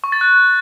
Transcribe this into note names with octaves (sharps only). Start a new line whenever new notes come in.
C#6
A6
F#6